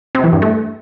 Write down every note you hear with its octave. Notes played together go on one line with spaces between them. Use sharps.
C3
E3
G2
A3